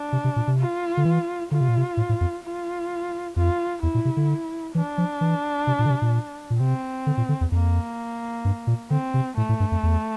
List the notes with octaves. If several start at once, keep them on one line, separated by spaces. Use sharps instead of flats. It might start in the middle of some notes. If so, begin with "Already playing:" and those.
Already playing: D4
C3
C3
A#2
C3
F4
D3
E3
D3 F4
C3
A#2
C3
A2
A2
F2
F4
F2 F4
E2 E4
A#2
C3
D3
E3 D4
F3
E3
C3
A#2
D3
C3
A#2
A#2
C3 C4
D3
A#2
D3
E2
F2 A#3
G2
A#2
D3 C4
C3
A2 A3
A2
G2
F2
E2